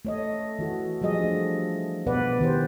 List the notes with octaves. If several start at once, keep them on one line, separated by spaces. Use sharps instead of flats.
A3 C#5 D#5
E3 F#4 A4
F3 G3 G#4 D#5
A3 D4
B2 B3 B4 D5 F#5
D#3 E3 G4 C5